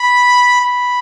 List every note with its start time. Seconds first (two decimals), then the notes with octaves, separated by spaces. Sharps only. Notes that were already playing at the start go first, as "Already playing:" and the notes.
Already playing: B5
0.61 B5